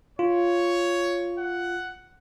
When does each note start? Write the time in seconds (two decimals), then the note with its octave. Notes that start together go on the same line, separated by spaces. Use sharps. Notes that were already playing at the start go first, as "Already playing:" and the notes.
0.19 F4 C#5
1.38 F#5